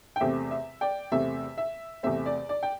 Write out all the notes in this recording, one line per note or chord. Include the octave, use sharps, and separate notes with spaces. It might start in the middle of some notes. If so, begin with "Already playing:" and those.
G5
E2 C3 A3 C4 E5
E5
D5 G5
E2 C3 A3 C4 E5
E5
E2 C3 A3 C4 E5
D5
D5
G5